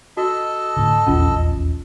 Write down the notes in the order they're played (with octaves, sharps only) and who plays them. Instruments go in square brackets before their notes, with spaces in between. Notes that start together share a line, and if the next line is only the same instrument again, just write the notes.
[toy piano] F#4 [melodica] A4 D#5 A5
[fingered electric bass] A2 D3
[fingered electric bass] D#1 A#1 E2 [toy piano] C#4 F4